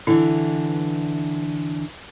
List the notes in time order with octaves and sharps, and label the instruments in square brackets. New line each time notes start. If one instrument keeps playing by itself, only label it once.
[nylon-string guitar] D3 E3 [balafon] E4